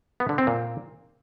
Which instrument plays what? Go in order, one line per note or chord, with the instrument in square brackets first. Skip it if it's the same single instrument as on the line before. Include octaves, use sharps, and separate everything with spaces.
[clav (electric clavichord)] B3
D3
C4
A#2